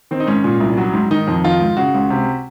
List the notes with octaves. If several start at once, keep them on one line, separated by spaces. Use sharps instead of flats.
D#3 C4
D#4
G#2 C#4
A#2
C2
F#3
G#2
D#3 D#4
F2
D#3 F4
G#2
C#3 F#4
C#2
C3